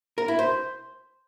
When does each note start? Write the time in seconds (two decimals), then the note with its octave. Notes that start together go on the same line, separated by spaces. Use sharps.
0.18 A#4
0.28 E4
0.39 C5